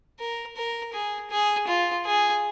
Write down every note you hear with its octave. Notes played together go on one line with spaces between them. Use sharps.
A#4
A#4
G#4
G#4
F4
G#4